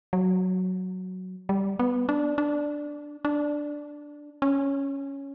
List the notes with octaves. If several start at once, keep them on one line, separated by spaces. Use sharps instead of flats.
F#3
G3
B3
D4
D4
D4
C#4